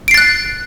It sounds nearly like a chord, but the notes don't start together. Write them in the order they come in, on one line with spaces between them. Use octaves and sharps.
D7 C7 A6 F#6